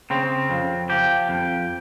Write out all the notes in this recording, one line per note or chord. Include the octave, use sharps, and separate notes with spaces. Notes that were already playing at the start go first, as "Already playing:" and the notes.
C#3 C4
F2
F3 G4
F2